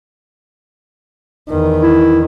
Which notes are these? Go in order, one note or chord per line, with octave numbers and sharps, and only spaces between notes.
E2 D#3
E4